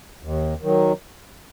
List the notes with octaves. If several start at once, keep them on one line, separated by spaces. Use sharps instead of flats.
D#2
D#3 F#3